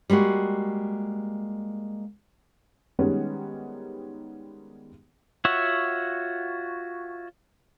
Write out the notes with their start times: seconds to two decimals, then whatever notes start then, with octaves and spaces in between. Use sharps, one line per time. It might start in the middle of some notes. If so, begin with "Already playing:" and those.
0.10 G3 G#3 A#3 F#4
2.99 D#3 G3 G#3 B3 C#4
5.45 F4 F#4 C#5 E5 F#5